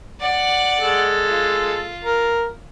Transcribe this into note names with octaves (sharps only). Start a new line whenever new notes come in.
D5 F#5
G#3 A4
F4
A#4